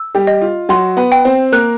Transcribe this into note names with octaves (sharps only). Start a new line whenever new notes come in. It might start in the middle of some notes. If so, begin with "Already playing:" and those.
Already playing: E6
G3 G4
D#5
F4
F#3 F#4 C6
B3 B4
G5
C4 C5
A#3 A#4 F#6